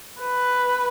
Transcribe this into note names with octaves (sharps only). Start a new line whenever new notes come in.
B4